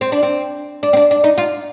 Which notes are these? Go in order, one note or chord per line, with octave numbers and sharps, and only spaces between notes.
C4
D4
C4
D4
C4
D4
D4
D#4
F4